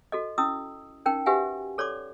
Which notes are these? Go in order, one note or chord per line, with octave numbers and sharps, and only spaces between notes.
F#4 A4 D#5
C#4 E4 D#6 E6
C#4 D#4 A#4 G5
F#4 G4 B4 E5 F#5 G#5
A4 C#5 D5 C6 D6